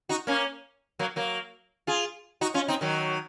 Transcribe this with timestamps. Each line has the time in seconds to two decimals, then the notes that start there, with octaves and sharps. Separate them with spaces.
0.09 D#4 F#4
0.27 A#3 C#4
0.99 F#3 A#3
1.16 F#3 A#3
1.87 F4 G#4
2.41 D#4 F#4
2.54 C#4 F4
2.68 C4 D#4
2.81 D#3 F#3